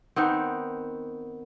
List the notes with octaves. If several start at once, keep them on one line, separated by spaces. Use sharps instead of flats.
D#3 B3 C4